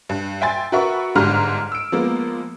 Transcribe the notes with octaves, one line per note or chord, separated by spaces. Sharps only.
G2
E5 G5 G#5 C6 A6
F#4 A#4 B4 E5 F#5 C#6
G1 G#2 D4 G4 A#5 F6
E6 D7
F3 G#3 A#3 B3